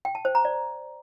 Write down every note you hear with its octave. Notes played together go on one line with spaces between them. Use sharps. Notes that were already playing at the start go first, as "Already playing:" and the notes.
G5
A5
C5
A#5
D5